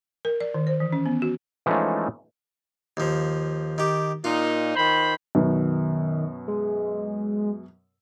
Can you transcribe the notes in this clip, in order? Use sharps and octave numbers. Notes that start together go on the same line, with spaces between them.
A#4
D5
D#3
C5
E3
C#4
B3
F#4
E3 F3 G#3 A3 C#4 D#4
D#2 F3
D#3 G4
A#2 D#4 F4
D#3 C5 B5
F#2 B2 D#3
G#3